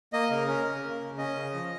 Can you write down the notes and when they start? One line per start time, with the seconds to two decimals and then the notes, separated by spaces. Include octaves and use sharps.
0.13 A#3 D#5
0.30 C#3 A#4
0.47 C#4 A#4
0.65 C#3
0.84 A#3
1.00 C#3
1.18 C#4 D#5
1.36 C#3
1.54 F3